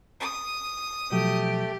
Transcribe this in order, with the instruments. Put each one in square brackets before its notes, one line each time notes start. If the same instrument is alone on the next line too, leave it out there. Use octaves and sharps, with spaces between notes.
[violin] D#6
[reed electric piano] B2 F3 F#3 [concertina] A3 [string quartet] G4